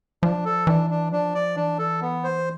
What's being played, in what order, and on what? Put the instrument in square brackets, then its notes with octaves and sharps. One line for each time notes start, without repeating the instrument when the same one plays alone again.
[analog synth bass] F3 [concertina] D4
[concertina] A4
[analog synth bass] E3 [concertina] D4
[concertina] D4
[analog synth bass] F3 [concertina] D4
[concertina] D5
[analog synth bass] E3 [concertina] D4
[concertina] A4
B3
C5